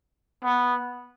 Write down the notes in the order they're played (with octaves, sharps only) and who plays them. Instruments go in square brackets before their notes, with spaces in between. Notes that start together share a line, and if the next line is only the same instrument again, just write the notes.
[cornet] B3